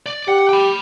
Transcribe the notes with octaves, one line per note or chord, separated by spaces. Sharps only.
D5
G4 F#5
G5 B5